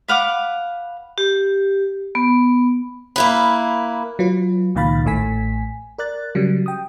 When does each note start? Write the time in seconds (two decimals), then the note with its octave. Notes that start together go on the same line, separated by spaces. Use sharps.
0.08 B4 F5 F#5 D6
1.18 G4
2.15 B3
3.16 A#3 E4 B4
4.19 F#3 F4 B4
4.75 C#2 A#2 D#3 F5 B5 A6
5.05 A1 A2 A3 G#5 B6
5.98 A#4 D5 F#6 A6
6.35 C#3 F#3 G3
6.66 G5 D#6